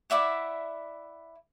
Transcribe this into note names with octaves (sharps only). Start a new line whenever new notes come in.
E4 D5 E5 F#5